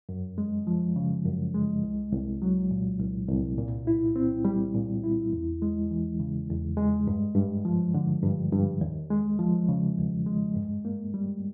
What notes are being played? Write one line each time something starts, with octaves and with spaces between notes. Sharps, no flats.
F#2
G#3
F3
C#3
F#2
G#3
C2
C2
F#3
A#2
C2
C2
A#2
E4
C4
G3
A#2
E4
E2
G#3
E3
C#3
E2
G#3
G2
G2
F3
D3
G2
G2
D#2
G#3
F3
C#3
D#2
G#3
G2
A#3
G3